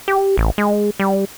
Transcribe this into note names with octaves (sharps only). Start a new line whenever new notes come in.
G4
A1
G#3
G3